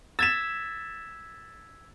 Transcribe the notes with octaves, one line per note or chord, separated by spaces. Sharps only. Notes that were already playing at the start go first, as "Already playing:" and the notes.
E6 G#6 A6 B6 E7